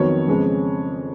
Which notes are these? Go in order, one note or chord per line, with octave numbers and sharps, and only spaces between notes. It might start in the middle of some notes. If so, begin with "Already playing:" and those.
Already playing: F2 D#3 F#3 B3 C#5
F2 C#3 G#3 B3